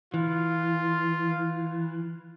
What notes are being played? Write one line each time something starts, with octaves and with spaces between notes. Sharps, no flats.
E3 F4